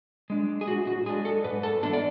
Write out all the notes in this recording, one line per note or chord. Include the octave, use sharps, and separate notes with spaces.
G#3 D4
G#4
A2 F#4
F#4
G#3 D4 G#4
A4
G#2 B4
A4
E3 B3 D4 A4
D5